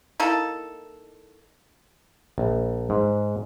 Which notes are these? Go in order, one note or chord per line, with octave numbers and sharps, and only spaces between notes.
A#3 D#4 E4 A4
A#1
G#2